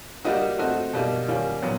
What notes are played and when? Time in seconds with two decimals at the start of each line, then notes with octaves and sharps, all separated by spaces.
0.25 G3 A#3 D#4 F#4
0.58 A3 C4 D#4 F#4
0.93 B2 G3 A#3 D#4
1.28 D#3 G3 A#3 C#4
1.62 A#2 F#3 B3